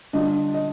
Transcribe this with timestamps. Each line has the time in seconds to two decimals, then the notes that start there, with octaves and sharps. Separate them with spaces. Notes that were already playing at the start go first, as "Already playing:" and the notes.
0.13 D3 G3 D4 F4 D#5
0.54 D#5